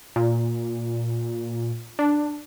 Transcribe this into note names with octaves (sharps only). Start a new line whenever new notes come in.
A#2
D4